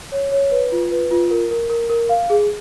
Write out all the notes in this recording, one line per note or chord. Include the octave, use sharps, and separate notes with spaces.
C#5
C#5
B4
F4
B4
F4
A#4
A#4
A#4
A#4
F5
G#4